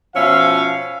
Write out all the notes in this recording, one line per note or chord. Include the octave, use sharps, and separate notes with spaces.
B2 F3 C#4 E5 F5